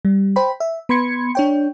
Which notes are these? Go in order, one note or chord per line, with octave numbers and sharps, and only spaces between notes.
G3
C5 G5 B5
E5
B3 B5 C6 G#6 C#7
D4 C#5 G5